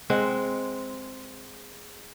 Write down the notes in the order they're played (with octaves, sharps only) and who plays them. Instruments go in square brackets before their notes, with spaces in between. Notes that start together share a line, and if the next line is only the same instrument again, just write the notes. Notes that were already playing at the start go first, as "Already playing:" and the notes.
[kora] G#3 C4 F#5